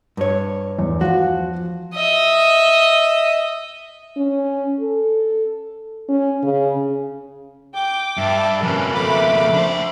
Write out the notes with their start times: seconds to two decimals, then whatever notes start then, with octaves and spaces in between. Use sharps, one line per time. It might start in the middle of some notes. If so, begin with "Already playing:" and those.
0.17 G2 C#5
0.79 E2
1.01 F3 F#4
1.95 D#5 E5
4.17 C#4
4.80 A4
6.08 C#4
6.43 C#3
7.75 G5 D6
8.18 G2 E5 A5
8.63 F2 C#3 C#4 A#4 B4
8.94 A3 B5 D6
9.54 D4 C5